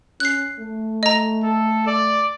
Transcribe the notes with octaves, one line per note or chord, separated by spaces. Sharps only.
C#4 F#6 C7
A3
D#5 A#5
A4
D5